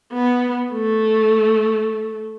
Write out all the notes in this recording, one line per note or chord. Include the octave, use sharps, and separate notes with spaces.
B3
A3